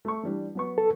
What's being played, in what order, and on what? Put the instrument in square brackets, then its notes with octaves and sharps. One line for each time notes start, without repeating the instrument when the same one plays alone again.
[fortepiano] A3 C#6
E3 G3 D4
F#3 B3 C#6
[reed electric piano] A4